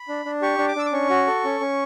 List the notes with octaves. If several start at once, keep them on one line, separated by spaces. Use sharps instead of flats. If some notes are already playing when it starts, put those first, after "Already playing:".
Already playing: B5
D4
D4
G4 C#6
D4
D6
D4 E6
D6
C#4 C#6
F#4
A4
C#4
C#4